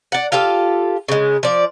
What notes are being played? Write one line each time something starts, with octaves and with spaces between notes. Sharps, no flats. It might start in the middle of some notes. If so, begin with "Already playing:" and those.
D5 F#5
F4 G4 A4 F5
C#3 G#3
F3 D5